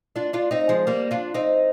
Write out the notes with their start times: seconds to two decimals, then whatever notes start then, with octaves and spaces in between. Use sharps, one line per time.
0.16 D4 F4
0.33 D4 F4
0.51 C4 D#4
0.69 F3 G#3
0.87 G3 A#3
1.11 D4 F4
1.34 C4 D#4